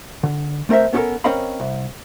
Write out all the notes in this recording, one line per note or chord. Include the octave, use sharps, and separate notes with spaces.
D3
A3 C4 A#4 C5 E5
B3 C#4 F#4 G4 A4 A#4
C4 C#4 A#4 D#5 F5 B5
C2